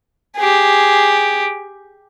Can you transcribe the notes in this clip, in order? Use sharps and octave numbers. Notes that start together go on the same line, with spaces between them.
G4 G#4